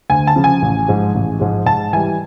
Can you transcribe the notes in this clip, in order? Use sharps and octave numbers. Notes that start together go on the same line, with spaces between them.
D2 G#5
A5
C#3 F3
G#5
A1
G#2 F3 G#3
A1
G#2 F3 G#3
G#2 A5
E3 G3 G#5